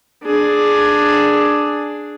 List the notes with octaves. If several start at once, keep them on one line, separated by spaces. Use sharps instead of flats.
D4 G#4